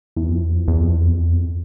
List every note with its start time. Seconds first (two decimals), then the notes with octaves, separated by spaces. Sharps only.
0.16 E2
0.29 F2
0.42 E2
0.55 F2
0.68 E2
0.81 F2
0.94 E2
1.06 F2
1.19 E2
1.32 F2